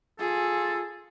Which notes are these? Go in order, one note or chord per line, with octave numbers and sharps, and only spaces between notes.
F4 G#4 A4